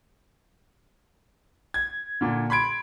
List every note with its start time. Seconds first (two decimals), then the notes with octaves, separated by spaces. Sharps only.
1.74 G#6
2.21 A#2 D3
2.50 B5 C6 G#6 D7